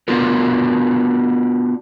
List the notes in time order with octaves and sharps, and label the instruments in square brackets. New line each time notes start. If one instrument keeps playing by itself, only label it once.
[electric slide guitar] B3 D4 F4 F#4 A#4